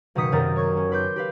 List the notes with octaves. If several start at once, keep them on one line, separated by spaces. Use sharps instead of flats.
F#1 B2 D#3 D#6 B6 C#7
F#2 C3 D#3 D#4 A#4 A6
C#5 C#6 G#6
C#4
B4 C6 D6 G6
G4 B4 F5